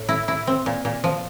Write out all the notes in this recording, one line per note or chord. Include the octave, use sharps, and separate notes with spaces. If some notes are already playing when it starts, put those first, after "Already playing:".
Already playing: A2
E4
E4
C4
A#2
A#2
F3